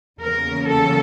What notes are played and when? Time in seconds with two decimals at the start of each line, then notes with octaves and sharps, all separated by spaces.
0.20 E2 C#3 F#3 A#3 C#4 A#4
0.67 A4